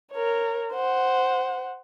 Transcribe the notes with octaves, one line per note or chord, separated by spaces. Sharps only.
A#4 C#5
C5 F#5